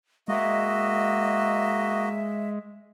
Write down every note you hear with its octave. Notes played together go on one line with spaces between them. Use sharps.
G#3 A#3 F#4 D#5 E5